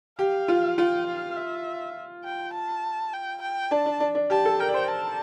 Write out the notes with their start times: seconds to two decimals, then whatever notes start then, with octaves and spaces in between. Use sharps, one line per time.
0.19 G4 F5
0.48 F4
0.78 F4 G5
1.06 F5
1.36 E5
2.25 G5
2.53 A5
3.13 G5
3.42 G5
3.71 D4 A5
3.86 D4
4.00 D4
4.15 D4
4.30 G4 A5
4.45 A4
4.60 A#4 G5
4.69 D5
4.74 C5
4.88 A5